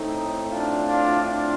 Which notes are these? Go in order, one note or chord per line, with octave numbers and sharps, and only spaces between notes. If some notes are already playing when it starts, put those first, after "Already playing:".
Already playing: A2 A3 C4 D#4
D4 F4
D4 F4
D4 F4